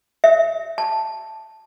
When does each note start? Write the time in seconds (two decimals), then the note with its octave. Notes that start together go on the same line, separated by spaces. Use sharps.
0.24 E5
0.78 A5